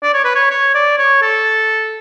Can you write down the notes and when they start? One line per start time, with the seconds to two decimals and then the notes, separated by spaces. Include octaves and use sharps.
0.03 D5
0.14 C#5
0.25 B4
0.35 C#5
0.51 C#5
0.75 D5
0.98 C#5
1.22 A4